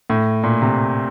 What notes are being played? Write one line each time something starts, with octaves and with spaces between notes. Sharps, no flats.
A2
A#2
C3